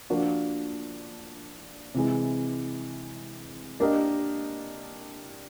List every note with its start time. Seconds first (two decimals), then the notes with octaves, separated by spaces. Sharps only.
0.10 F3 A#3 D4 F#4
1.94 C3 E3 G#3
3.80 A#3 D4 G4 A#4 D#5